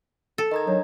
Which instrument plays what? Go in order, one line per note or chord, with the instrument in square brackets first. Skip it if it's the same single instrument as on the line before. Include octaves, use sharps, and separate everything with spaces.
[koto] A4
[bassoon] D#3 [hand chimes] D#5 A#5 G#6
[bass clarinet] F#3 [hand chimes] D4